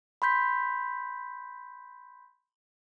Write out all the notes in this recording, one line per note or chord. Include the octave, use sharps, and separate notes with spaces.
B5 C6 G6 B6